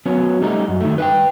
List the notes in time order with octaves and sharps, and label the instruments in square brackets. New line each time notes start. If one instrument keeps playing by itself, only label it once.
[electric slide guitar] F#3 B3 C#4
G3 A3 D#4
F#2
D#3 A3
B4 E5 G5